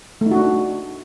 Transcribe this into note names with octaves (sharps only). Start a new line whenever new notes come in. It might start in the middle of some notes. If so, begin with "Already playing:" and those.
A3
D#4
F#4
D4
F#4